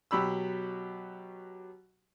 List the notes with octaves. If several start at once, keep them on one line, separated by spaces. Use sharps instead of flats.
B2 F#3 G4 B5 E6